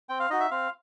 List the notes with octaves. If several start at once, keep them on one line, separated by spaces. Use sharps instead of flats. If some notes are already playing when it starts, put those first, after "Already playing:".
C4 G5
F5
D#4 F#4 D#5
E5
C4 F5